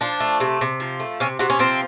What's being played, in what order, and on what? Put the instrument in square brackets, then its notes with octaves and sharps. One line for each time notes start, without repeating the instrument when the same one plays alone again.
[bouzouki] F3 D4
A3
C3
C3
F3
A3
C3 C#4
C3 F#4
C#4
F3 C4